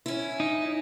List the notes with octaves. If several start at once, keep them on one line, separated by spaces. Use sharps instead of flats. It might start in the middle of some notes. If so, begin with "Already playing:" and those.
C#4 E4
D#4